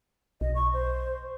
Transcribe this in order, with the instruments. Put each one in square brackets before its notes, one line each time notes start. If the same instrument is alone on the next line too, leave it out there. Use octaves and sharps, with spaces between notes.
[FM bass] B1 [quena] D#5
[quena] C#6
C5